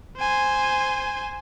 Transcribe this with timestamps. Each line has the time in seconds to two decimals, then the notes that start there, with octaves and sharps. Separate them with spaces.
0.18 C5 G#5